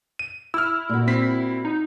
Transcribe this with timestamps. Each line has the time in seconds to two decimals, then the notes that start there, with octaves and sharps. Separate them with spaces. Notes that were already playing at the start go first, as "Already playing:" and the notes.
0.19 D#7
0.54 E4 E6 F6
0.89 A#2 F#4
1.08 C4 B6
1.65 D#4